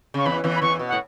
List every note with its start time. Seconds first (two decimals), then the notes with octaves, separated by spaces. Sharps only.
0.14 C#3 C#6
0.26 E2 E3 B5
0.44 E2 E3
0.56 B5
0.62 E2 E3 C#6
0.79 B2
0.88 F#5
0.93 A2